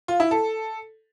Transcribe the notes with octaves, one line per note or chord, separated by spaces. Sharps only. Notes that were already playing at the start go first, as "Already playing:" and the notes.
F4
E4
A4